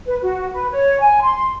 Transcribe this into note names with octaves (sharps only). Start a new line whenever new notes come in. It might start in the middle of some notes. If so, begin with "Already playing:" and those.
B4
F#4
B4
C#5
G#5
C6